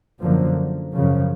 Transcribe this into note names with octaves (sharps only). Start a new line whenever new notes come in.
F#2 D3 F3 A#3
F#2 C#3 F3